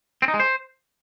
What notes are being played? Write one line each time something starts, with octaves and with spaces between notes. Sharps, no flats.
C4
D#4
G#3
C5